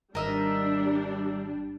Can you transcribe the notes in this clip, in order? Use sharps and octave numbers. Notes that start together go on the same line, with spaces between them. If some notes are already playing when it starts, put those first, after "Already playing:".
G#1 G3 D4 A#4 D#5 E5